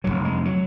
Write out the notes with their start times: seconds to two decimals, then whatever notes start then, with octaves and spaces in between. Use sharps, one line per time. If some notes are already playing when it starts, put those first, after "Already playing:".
0.04 F1 D#2 D3 F#3
0.25 G#3
0.45 F#3